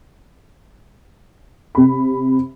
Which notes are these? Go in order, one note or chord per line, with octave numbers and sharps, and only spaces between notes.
C3 B5